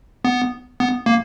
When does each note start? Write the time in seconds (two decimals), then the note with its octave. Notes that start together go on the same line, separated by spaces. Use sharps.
0.25 B3
0.80 B3
1.06 A#3